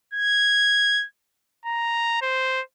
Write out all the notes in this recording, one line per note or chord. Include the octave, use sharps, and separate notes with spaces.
G#6
A#5
C5